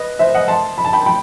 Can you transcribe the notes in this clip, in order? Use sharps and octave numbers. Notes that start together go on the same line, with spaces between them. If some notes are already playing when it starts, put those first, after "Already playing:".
Already playing: B4 D#5
C5 E5
D#5 F#5
A5 C6
B5
A5
G5 B5
G5 B5